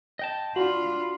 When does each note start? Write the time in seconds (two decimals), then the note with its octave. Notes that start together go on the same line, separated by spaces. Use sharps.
0.19 D#5 G5 A5
0.56 D4 F4 F#4 B5